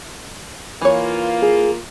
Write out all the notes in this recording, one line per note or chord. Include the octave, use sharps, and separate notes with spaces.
E3 A#3 F4 C#5
G#4